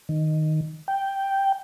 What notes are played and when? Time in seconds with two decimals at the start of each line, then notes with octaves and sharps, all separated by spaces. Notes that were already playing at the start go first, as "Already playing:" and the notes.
0.09 D#3
0.88 G5